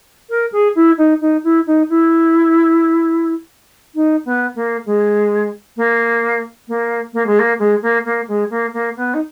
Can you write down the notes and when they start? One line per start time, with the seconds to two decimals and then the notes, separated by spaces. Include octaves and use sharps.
0.30 A#4
0.52 G#4
0.75 E4
0.98 D#4
1.21 D#4
1.44 E4
1.67 D#4
1.89 E4
3.95 D#4
4.25 B3
4.55 A#3
4.86 G#3
5.77 A#3
6.68 A#3
7.13 A#3
7.26 G#3
7.39 A#3
7.59 G#3
7.82 A#3
8.05 A#3
8.28 G#3
8.50 A#3
8.73 A#3
8.96 B3
9.14 D#4